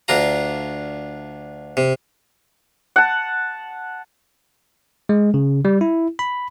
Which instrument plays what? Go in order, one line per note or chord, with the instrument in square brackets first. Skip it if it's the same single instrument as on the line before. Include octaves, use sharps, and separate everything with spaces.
[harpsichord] D2 D4 F4 A#5
C3
[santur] F#5 A5
[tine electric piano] G#3
C#3
G3
E4
B5